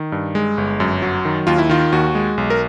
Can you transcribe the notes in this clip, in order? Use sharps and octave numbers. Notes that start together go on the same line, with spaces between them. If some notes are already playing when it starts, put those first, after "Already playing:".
Already playing: D#3
G2
G#3
G1
F#2
F#3
D#3
D#2 F4
E4
D#3 F4
D#2 F#4
G#3
B1
A#4